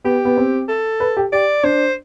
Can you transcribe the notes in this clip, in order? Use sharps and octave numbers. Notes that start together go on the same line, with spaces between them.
B3 G4
B3
C4
A4
B4
G4
G4 D5
D4 C5